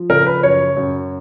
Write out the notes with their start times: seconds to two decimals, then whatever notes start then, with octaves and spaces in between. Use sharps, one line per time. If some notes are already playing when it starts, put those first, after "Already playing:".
Already playing: F3
0.10 C#3 A#4
0.26 B4
0.43 F#2 C#5
0.76 F#2